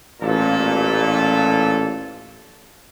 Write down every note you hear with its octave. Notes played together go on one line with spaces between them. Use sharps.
A1 A#2 A4